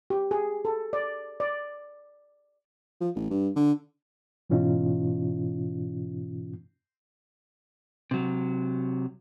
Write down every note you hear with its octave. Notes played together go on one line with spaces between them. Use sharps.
G4
G#4
A4
D5
D5
F3
A1
G2
D3
G#2 B2 E3 C#4 D#4 F4
C3 F#3